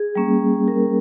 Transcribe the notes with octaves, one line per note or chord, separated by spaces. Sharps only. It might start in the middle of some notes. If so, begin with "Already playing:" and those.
Already playing: G#4
G3 A#3 C#4
A#4